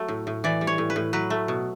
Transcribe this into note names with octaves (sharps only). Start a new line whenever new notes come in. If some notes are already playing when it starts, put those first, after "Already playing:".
Already playing: F#3 A3
A2
A2
E3 D5
G3
C#5
A2
B4
A2
F#3 B4
A3
B2